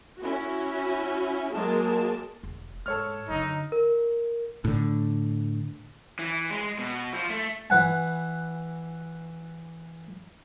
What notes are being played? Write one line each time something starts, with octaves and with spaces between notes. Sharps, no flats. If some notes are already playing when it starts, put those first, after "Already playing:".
C#4 E4 F#4
F#3 G#3 A#3 G#4 A#4 A5
E1
G#2 A4 C#5 F6
F#2 D3 D#4
A#4
A2 D3
E3
G#3
B2
F3
A3
E3 B4 F#5 G#5